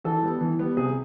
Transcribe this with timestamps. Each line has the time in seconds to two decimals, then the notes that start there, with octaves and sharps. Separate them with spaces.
0.04 E3 A4
0.23 G3 B3
0.41 E3
0.59 G3 B3
0.77 C3 G#4